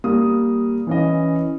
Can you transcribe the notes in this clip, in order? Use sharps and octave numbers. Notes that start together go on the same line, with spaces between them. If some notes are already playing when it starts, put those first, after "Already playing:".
G3 A#3 D#6
E3 C#4 D#5